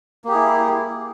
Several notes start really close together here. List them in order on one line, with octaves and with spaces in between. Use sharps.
A#3 G4 G#4 E4